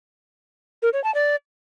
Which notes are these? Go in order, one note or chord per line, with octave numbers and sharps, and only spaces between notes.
A#4
C#5
A5
D5